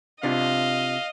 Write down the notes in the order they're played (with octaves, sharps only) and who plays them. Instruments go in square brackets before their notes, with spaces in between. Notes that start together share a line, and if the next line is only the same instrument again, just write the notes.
[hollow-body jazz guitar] C3 D4 F4 [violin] D#5 [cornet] F5